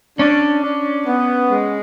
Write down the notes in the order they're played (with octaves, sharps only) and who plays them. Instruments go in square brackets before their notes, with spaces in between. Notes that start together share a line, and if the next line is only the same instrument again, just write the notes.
[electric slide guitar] C#4 [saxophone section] D4
[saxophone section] D4
B3
G#3